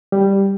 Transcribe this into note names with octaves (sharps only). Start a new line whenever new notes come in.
G3